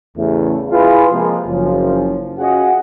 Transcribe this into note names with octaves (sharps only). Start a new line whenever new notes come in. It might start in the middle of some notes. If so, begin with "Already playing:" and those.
A1 E2 C#3 A3
E4 F4 G#4 B4
C3 F3 G#3 A#3
F#1 F3 C#4
C#4 F4 F#4 G#4 D#5 F#5